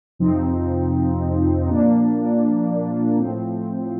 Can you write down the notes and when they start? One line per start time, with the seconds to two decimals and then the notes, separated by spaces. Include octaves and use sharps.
0.19 F2 C3 F3 C4 D#4
1.62 D#4
1.69 A#2 F3 A#3 D4
3.17 A2 F3 C4